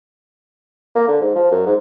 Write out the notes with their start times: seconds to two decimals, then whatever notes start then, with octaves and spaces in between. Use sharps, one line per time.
0.96 A#3
1.08 D3
1.21 G#2
1.35 F3
1.52 F#2
1.66 G#2